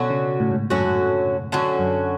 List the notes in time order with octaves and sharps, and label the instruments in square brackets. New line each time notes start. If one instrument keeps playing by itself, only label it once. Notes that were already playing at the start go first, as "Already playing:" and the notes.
Already playing: [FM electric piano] B2 [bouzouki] D3 F#3 C#4 F#4
[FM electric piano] C#3
A2
G#2
[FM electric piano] F#2 [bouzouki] D3 F#3 C#4 F#4
[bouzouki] D3 F#3 C#4 F#4
[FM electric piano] F#2